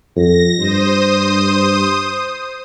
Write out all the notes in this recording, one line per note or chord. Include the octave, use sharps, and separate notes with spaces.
F2 A#6
G2 C5 D#6